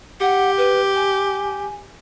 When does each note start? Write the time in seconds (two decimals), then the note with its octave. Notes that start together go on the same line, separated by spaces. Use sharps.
0.21 G4 F#5
0.57 B4
0.95 G#5